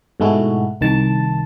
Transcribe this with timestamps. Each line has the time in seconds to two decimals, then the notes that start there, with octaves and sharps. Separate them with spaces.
0.20 G#2 B2 G#3 A3 E4 F#4
0.81 C2 D#3 A5